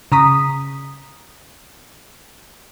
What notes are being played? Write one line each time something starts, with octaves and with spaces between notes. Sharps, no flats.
C#3 A#5 D#6 B6